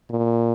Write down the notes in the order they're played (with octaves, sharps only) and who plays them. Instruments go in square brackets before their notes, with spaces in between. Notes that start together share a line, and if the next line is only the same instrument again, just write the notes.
[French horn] A#2